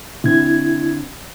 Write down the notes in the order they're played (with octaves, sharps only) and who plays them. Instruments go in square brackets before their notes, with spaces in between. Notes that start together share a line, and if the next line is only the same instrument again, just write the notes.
[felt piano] D3 C4 [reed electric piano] E4 G#6